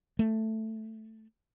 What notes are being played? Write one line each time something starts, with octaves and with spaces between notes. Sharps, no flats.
A3